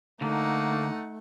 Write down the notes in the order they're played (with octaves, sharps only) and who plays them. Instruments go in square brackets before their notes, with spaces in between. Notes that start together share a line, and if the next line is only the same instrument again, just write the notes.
[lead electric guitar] D2 D3 [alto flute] A3 [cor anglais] A#3 [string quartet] D#4 F#5